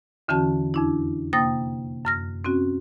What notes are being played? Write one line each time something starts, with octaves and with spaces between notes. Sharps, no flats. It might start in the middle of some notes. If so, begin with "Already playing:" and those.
E2 D3 E3 C#4 F#4 A5
F2 D4 E4
C3 A#3 G5 D#6 A6 A#6
F#2 F6 A#6
C4 C#4 F#4